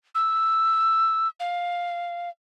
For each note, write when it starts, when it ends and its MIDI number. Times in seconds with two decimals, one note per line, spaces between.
0.15 1.28 88
1.40 2.29 77